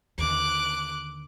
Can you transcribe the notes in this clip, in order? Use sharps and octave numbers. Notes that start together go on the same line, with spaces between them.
D#2 D3 D6 F#6